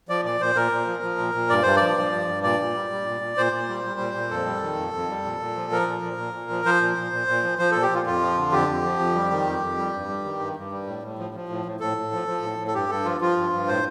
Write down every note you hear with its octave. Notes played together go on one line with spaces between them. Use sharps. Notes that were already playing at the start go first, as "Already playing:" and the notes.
F3 D5
A#2 D5
A#2 C5
A#2 A#4
A#2
F3
F3
A#2
A#2
G2 D5
G2 C5
D5
F3
F3
G2
G2
A#2 D5
A#2
G3
G3
A#2
A#2
A#2 C5
A#2
G3
G3
A#2
A#2
F2 A4
G3
D#3
F2
F2
G3
A#2
A#2
F3
F3 A#4
A#2
A#2
A#2
A#2
F3
F3 C5
A#2
A#2
A#2
A#2
F3
F3 C5
A#2 A4
G4
A#2 F4
F2 F4
F3
D3
F2 G4
F2
F3
F2
G3
D#3
F2
F2
G3
G2
G3
D#3
G2
G2
G3
A2
A2
F3
F3
A2
A2
A2 A4
A2
F3
F3
A2
A2
A4
G2 G4
G2 A4
F3 F4
F3 F4
G2
G2
A2 C5